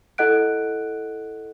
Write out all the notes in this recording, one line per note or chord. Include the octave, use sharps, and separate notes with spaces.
E4 A4 D#5 F#5 F#6 D7